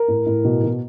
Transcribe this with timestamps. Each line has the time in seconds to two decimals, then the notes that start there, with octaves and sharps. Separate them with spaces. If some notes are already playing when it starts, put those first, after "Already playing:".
Already playing: A#4
0.08 A2
0.27 A2
0.44 B2
0.63 B2